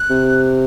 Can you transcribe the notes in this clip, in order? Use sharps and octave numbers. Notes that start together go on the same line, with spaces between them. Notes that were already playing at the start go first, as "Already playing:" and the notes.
Already playing: F#6
C3